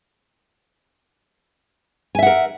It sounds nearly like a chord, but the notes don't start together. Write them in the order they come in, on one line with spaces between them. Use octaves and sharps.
G#5 E5 F#5 A#4